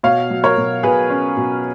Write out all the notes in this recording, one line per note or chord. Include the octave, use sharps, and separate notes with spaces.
B2 C#5 F5
F#3
A#4 C#5
B2
B2 G#4 B4
C#4
B2